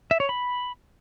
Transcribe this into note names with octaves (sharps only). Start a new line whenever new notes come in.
E5
C#5
B5